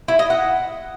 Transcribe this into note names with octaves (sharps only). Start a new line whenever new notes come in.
E4
D#5
F#5